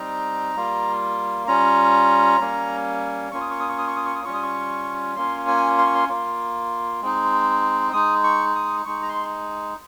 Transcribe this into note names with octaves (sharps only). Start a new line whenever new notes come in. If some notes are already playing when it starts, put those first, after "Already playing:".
Already playing: G3 C4 D#4 A#5
G3 A#3 F4
G3 C#4 F4 A#5
G3 A#3 C#4
A#3 C#4 F4 C#6
D#6
C#6
D#6
C#6
D#6
C#6
D#6
C#6
D#6
G3 C#4 F4 C#6
D#6
C#6
A#3 C#4 F4 C6
G#5
C6
C#6
C6
A#3 F4
G#3 C4 D#4
G#3 D#4 D#6
C#6
D#6
G#3 D#4 C#6
A#5
C6